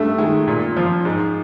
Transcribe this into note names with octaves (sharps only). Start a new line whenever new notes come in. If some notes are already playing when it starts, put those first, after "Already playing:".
Already playing: G2 A3
D#3 G#3
A#2
F3
G#2